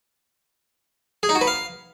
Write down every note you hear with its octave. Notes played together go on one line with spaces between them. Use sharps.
G#4
D#4
F#4
B4
F5